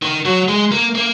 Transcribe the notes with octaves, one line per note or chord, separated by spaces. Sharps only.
D#3
F#3
G#3
A#3
A#3